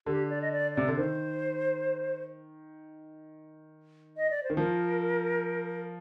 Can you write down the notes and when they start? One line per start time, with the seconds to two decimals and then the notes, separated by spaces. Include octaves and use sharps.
0.06 D3 G4
0.29 D5
0.42 D#5
0.52 D5
0.74 C3 D5
0.88 D3
0.97 D#3 C5
4.17 D#5
4.31 D5
4.43 C5
4.50 D#3
4.57 F3 A#4